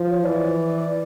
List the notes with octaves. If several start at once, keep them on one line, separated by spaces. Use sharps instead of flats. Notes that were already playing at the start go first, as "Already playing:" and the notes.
Already playing: F3
C#5
E3 D5